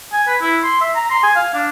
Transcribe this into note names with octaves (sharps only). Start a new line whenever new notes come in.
G#5
B4
E4
C6
E5
A#5
C6
G#5
F5
D4